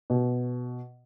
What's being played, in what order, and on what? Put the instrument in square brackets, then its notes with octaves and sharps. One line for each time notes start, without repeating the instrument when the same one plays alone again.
[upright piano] B2